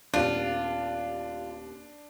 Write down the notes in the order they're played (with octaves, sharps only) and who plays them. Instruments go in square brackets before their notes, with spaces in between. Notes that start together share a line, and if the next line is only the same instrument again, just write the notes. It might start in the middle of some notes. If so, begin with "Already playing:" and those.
[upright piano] D#1 D#2 B3 [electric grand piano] D4 [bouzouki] F4